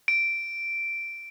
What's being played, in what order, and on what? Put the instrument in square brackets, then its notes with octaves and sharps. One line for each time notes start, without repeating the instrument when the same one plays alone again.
[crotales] D7